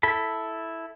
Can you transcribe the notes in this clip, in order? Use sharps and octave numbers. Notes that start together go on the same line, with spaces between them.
E4 A4 B5